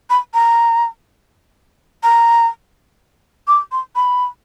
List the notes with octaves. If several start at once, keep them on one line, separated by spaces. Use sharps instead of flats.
B5
A#5
A#5
D6
C6
B5